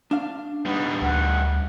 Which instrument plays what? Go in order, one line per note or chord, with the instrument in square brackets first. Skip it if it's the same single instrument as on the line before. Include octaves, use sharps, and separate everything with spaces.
[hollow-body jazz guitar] D4 F5
[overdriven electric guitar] G3 D#4 [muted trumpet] B3
[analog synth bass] D2 [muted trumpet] F#5